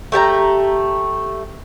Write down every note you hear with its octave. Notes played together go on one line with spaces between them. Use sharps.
A3 G4 A5 A#5